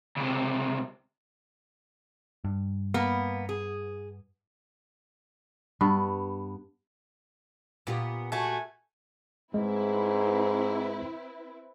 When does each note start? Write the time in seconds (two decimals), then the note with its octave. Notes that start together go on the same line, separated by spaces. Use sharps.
0.17 C#2 C3
2.44 G2
2.94 A#3 B3
3.49 G#4
5.81 G2 B3
7.87 A#2 B3 F4 G4
8.32 A3 F#4 G#5
9.54 G#2 G#3 C4 E4 B4